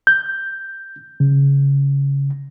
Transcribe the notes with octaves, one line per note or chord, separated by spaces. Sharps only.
G6
C#3